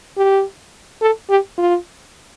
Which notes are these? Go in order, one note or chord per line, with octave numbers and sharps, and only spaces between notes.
G4
A4
G4
F4